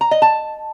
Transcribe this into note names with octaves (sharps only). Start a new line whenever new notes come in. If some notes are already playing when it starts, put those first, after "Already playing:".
A#5
D#5
A5